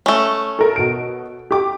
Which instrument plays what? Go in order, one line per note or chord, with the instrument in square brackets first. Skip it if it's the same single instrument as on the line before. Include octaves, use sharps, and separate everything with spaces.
[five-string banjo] A3 C#4
[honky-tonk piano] A4 A#4
B2 D7
G4 D6